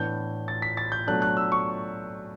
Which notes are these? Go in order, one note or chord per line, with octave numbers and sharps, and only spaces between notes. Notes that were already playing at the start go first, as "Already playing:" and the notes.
Already playing: A2 E3 B3 D4 G6
A6
B6
A6
G6
B2 F#3 A3 D4 F#6
F#6
E6
C#6